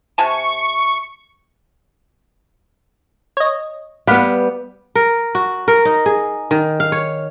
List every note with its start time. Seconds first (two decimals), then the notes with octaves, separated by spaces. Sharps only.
0.18 C3 G#5 A5 C#6
3.37 C#5 D#5
4.07 G3 B3 F5 F#5 B5
4.95 A#4
5.35 F#4
5.68 A#4
5.85 D#4
6.06 G#4
6.51 D#3
6.80 F5
6.92 C#5